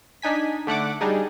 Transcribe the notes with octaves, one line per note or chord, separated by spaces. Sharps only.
D4 D#4 G#5 B6
D3 A3 F#5 D6
G3 D4 D#4 G#4